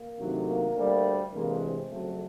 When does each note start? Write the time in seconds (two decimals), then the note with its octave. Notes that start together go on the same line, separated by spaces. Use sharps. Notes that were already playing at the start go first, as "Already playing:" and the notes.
Already playing: A#3
0.18 D2 C3 D#3 F#3 A3
0.47 A#3
0.75 D2 D3 G3
1.33 D2 C3 E3 G#3 A#3
1.61 C4
1.90 F2 C#3 F#3 A3